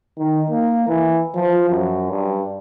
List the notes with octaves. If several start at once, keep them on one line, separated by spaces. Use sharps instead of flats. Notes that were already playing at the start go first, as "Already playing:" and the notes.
D#3
A#3
E3
F3
F#2
G2